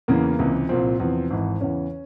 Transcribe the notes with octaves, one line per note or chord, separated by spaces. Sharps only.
E2 C#3 E3 A#3
C#2 C3 E3
C2 A#2 F3 C4
E2 C3 F3
G#1 G#2 E3
E2 C#3 E3 C#4